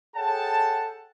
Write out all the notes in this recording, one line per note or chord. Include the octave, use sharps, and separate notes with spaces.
G#4 A4 C#5 F#5 G5 A5